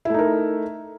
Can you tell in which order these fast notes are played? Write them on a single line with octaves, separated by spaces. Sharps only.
E4 A3 D#4 A#4